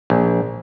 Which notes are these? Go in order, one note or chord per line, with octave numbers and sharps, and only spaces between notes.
A#1